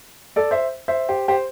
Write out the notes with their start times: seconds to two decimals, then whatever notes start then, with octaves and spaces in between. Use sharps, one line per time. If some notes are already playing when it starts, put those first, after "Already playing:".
0.36 A4 D5
0.51 C5 E5
0.88 C5 E5
1.09 G4 C5
1.28 G4 C5